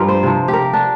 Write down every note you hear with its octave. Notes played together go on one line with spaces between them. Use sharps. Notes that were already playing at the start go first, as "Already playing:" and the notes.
Already playing: G2 F3 F4 G4 A#4
C5
C3 F3
G4
A#4
D4